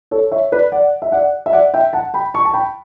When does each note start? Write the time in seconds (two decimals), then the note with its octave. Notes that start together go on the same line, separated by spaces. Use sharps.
0.11 A4 C#5
0.32 C#5 E5
0.52 B4 D5
0.72 D5 F#5
1.02 E5
1.12 D5 F#5
1.46 E5
1.53 D5 F#5
1.74 E5 G5
1.93 F#5 A5
2.14 G5 B5
2.34 A5 C#6
2.45 A5
2.54 G5 B5